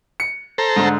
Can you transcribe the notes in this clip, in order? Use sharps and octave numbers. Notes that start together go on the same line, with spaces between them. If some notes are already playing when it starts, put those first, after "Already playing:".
C#7
A4 C5 A#5
G#2 D3